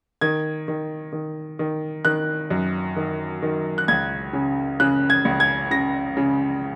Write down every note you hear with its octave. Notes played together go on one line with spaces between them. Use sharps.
D#3 G#6
D#3
D#3
D#3
D#3 F#6
F#2
D#3
D#3
F#6
C#2 G#6
C#3
C#3 F#6
G#6
C#2
G#6
C#3 A#6
C#3